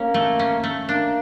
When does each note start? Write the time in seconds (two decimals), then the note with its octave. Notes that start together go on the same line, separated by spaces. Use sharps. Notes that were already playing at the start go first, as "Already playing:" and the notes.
Already playing: A#3 C#4
0.14 A3
0.39 C#4
0.64 A3
0.88 A#3 D4